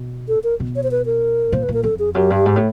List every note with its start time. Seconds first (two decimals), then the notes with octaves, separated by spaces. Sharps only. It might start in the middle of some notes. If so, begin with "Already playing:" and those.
Already playing: B2
0.28 A4
0.44 A#4
0.60 B2
0.76 C#5
0.83 C5
0.91 B4
1.06 A#4
1.52 A#2 C5
1.63 B4
1.68 A#2
1.74 A#4
1.83 F2 A4
1.99 G#4
2.15 F#2 G4
2.30 G2
2.46 G#2
2.56 A2